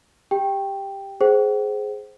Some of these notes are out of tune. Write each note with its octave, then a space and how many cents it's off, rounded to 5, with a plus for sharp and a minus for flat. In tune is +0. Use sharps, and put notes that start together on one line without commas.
G4 +10 G5 +0
G#4 +15 C5 +0 F#5 +45